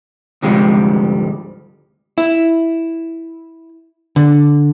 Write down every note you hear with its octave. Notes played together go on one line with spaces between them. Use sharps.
D2 G#2 C3 F3 G3 G#3
E4
D3